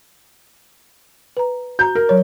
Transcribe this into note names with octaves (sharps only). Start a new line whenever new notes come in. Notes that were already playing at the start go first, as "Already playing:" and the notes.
B4 A#5
F#4 A#5 G6
A#4
F#3 C#5